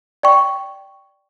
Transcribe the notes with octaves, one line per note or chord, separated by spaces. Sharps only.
D5 G5 C#6